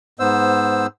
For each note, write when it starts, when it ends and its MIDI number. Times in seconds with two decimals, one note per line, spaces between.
0.20 0.87 44
0.20 0.87 59
0.20 0.87 72
0.20 0.87 88